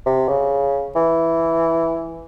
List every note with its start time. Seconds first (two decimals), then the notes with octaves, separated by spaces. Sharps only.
0.06 C3
0.28 C#3
0.96 E3